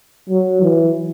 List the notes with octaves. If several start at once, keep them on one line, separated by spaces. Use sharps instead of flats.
F#3
E3